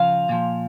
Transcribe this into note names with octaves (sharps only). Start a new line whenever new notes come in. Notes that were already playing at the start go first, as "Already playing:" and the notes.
Already playing: C#3 F3 F5
A#2 F3